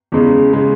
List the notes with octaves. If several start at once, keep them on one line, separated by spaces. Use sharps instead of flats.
E2 C#3 G#3
C#3 G#3